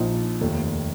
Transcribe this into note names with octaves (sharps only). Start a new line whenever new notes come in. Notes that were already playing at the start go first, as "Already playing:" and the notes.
Already playing: A#1 A#2 F3 D#4
F1 D#2 D#3